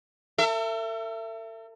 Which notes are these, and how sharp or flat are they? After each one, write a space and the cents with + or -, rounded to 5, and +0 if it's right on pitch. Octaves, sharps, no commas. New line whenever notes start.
A4 +45 E5 +25